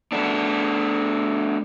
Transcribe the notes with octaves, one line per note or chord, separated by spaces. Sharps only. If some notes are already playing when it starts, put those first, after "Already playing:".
A3 B3 D4